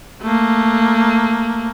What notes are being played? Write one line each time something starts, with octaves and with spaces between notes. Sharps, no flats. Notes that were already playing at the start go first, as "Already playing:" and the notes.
A3 A#3